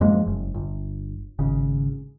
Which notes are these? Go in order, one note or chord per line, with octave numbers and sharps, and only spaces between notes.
F#2 F3 G#3 A#3
F#1
G1
G#1 C#3